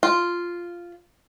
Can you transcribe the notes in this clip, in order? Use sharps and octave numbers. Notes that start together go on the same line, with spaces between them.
F4